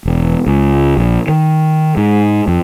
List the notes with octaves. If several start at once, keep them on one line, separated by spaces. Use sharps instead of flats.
E1
C#2
A#1
D#3
G#2
F2